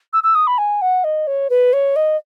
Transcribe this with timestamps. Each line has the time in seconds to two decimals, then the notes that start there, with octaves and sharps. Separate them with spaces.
0.13 E6
0.23 E6
0.35 D#6
0.47 B5
0.58 G#5
0.81 F#5
1.04 D#5
1.27 C#5
1.50 B4
1.73 C#5
1.96 D#5